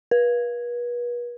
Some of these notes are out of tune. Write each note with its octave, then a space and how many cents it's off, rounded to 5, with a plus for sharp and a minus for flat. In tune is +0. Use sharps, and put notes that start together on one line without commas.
B4 -40